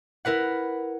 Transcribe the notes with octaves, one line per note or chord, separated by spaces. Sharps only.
E4 A#4 B4 F#5